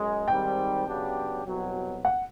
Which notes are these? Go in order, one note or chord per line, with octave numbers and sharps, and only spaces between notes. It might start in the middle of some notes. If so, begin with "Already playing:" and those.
Already playing: F#2 G#3
G#2 D#3 G3 C4 G5
C#3 F#3 B3 D4 G4
C2 B2 F#3
F#5